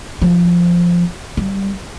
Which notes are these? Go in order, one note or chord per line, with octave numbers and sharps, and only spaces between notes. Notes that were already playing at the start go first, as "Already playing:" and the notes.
F3
G3